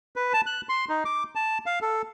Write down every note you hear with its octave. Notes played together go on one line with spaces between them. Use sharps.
B4
A5
F#6
C6
D#4
D6
A5
F5
A4